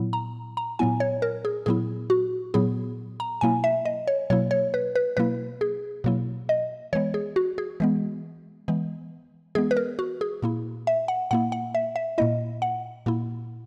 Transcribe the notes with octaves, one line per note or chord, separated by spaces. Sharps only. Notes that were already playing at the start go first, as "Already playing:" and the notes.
Already playing: A#2 F#3 B3 E4
A#5
A#5
A#2 F#3 B3 E4 G#5
C#5
A#4
G#4
A#2 F#3 B3 E4 G#4
F#4
A#2 F#3 B3 E4 G#4
A#5
B2 F#3 A#3 E4 G#5
E5
D#5
C#5
B2 F#3 A#3 E4 C#5
C#5
B4
B4
B2 F#3 A#3 E4 B4
G#4
B2 F#3 A#3 E4
D#5
E3 G#3 B3 C#5
G#4
F#4
G#4
E3 G#3 B3
E3 G#3 B3
E3 G#3 B3 G#4
B4
A#4
F#4
G#4
A#2 A#3 E4
E5
F#5
A#2 A#3 E4 F#5
F#5
E5
E5
A#2 A#3 E4 D#5
F#5
A#2 A#3 E4